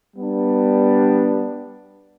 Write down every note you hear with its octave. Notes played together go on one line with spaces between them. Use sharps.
G3 B3 D4